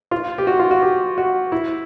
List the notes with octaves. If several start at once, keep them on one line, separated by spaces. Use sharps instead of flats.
F4
G4
F#4
F4
F#4
G4
F#4
E4